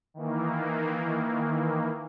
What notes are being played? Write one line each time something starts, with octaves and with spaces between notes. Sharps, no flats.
D#3 E3 A#3